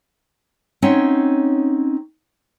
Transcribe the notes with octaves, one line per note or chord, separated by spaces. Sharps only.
C4 C#4 D#4 C#5 E5 F#5